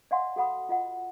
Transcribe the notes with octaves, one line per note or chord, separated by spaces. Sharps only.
D5 D#5 F5 F#5 G#5 C6
F#4 A4 F#5 B5 D#6
F4 D#5 F#5